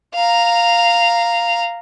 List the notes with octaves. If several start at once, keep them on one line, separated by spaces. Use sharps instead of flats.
F5 A#5